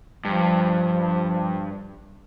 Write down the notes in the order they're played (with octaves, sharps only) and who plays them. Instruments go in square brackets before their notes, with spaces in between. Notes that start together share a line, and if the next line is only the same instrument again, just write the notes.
[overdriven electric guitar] G2 [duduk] F3